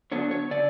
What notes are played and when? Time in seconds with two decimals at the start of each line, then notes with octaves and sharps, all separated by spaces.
0.12 D3 F#3 B3 D4 C#5
0.31 C#5
0.51 C#3 D5